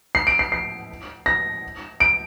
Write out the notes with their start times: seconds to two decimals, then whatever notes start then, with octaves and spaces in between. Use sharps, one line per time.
0.15 C7
0.27 D7
0.39 C7
0.52 C7
1.26 A#6
2.00 D7